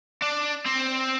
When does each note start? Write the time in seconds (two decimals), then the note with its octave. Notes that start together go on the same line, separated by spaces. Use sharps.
0.22 D4
0.66 C4